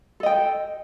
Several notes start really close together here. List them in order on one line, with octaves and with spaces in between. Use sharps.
A4 D#5 G5